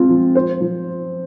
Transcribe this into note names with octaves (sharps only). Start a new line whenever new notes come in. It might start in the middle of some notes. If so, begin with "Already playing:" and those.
Already playing: G#3 C4 F4
F3
C5
F3